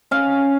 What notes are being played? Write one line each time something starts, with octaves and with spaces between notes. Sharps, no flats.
C#4 F5